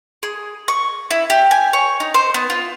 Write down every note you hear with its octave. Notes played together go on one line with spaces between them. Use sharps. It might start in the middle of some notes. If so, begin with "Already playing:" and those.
G#4
C#6
E4
G4
G#5
C#5
D#4
C5
B3
F4